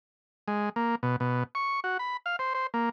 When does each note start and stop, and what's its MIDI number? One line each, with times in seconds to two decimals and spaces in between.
0.48 0.69 56
0.76 0.95 58
1.03 1.16 47
1.20 1.43 47
1.55 1.80 85
1.84 1.97 66
1.99 2.17 83
2.26 2.36 77
2.39 2.53 72
2.55 2.67 72
2.74 2.89 58